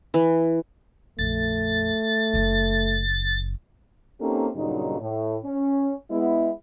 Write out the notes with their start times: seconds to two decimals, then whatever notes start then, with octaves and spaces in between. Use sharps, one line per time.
0.14 E3
1.19 A#1 F2 A3 A6
2.34 F#1 C#3
4.21 A#3 C4 C#4 D#4 G4 A4
4.56 G2 A#2 C#3 F#3 D#4
5.00 A2
5.44 C#4
6.10 G#3 B3 E4